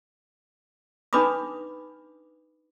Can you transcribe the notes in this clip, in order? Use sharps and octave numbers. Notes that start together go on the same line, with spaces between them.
D4 D#4 B4 B5 D6 D#6